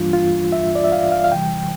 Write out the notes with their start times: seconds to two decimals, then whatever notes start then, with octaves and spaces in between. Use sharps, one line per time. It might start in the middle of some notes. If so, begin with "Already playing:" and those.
Already playing: G2 E3 G3 A#3 D4 F4
0.13 F4
0.52 E5
0.75 D5
0.84 E5
0.92 F5
1.12 F5
1.24 F5
1.32 C3 E3 G3 G5